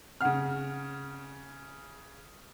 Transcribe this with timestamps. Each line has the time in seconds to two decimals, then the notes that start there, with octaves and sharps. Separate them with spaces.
0.21 C#3 C4 F#5 F6